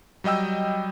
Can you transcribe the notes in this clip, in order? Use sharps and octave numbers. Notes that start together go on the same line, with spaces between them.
F#3 G3 D#5 G5 E6